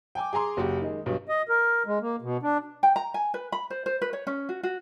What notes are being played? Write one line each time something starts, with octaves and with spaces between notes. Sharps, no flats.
G5 G#5 D6
G#4 G#5 A#5 C6 D6
F#1 F#4 G4
D#3 G#3
B1 G2 B2
D#5
A#4
G#3
A#3
B2
D4
G5
A#5
G#5
B4
B5
C5
C5
B4
C#5
C#4
F#4
F#4